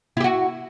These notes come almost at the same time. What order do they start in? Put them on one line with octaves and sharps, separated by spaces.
E4 G4 F#4